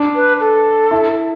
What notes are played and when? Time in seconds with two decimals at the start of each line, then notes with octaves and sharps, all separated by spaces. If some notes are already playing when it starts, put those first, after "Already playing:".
Already playing: D4
0.15 B4
0.40 A4
0.91 E4